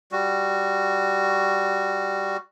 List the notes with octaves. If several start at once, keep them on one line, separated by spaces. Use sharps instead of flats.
G3 F#4